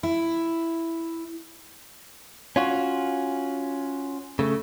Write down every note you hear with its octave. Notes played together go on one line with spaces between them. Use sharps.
E4
C#4 F4 F#4
C#3 A3